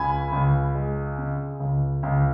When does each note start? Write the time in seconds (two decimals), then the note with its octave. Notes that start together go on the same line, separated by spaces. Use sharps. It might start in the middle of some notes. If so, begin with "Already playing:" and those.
Already playing: C#2 C#3 G#5 B5
0.32 C#2
0.75 G#3
1.18 C#3
1.60 C#2
2.03 C#2